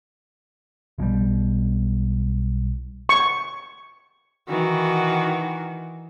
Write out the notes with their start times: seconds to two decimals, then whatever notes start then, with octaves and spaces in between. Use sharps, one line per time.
0.98 B1 B2 E3 G3
3.09 C#6
4.48 D#3 E3 F#4